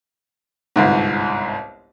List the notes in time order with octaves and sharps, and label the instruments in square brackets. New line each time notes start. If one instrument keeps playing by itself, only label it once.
[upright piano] G1 C2 G#2